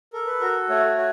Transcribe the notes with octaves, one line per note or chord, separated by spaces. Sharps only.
A4 A#4
B4
F#4 A#4
A3 C#5
F#4 C#5